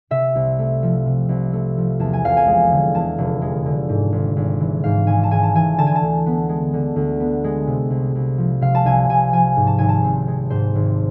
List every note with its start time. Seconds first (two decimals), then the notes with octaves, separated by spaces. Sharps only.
0.11 C3 E5
0.35 C2
0.59 A3
0.83 F3
1.06 C3
1.29 C2
1.53 A3
1.77 F3
1.99 E2 A5
2.13 G#5
2.24 F1 F5
2.37 G#5
2.47 G#3
2.71 D3
2.95 E2 A5
3.18 F1
3.42 G#3
3.65 D3
3.89 G#2
4.12 G#1
4.36 G#1
4.60 E3
4.84 G#2 F5
5.07 G#1 G#5
5.23 A5
5.31 G#1 G#5
5.43 A5
5.55 E3 G#5
5.78 D3 A5
5.87 G#5
5.95 A5
6.02 D2
6.26 B3
6.49 G#3
6.73 D3
6.96 D2
7.20 B3
7.44 G#3
7.67 C3
7.90 C2
8.15 C2
8.38 F3
8.61 C3 F5
8.75 A5
8.85 C2 G#5
9.09 C2 G#5
9.33 F3 G#5
9.56 G#2
9.67 A5
9.78 G#1 G#5
9.89 A5
10.04 C4
10.28 G#3
10.50 G#2 C5
10.75 G#1